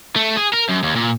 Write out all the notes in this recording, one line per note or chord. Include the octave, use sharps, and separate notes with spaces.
A3
G#4
A#4
F#2
D#2
A#2